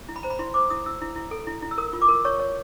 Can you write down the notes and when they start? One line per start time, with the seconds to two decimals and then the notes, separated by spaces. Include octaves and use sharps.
0.09 E4
0.16 B5
0.23 C5 A#5
0.30 B5
0.39 E4 C6
0.54 C5 D6
0.70 E4 D#6
0.86 E4 E6
1.01 E4
1.16 E4
1.31 A4
1.47 E4
1.62 E4
1.71 E6
1.78 A#4 D#6
1.93 F4
2.02 D6
2.09 A#4
2.24 C#5 C#6
2.39 C#5